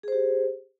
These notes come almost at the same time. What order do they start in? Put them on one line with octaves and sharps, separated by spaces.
G#4 C5 G4